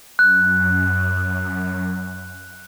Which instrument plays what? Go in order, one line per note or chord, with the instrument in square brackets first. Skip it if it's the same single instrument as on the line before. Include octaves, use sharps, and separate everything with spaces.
[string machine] F#2 [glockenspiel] F#6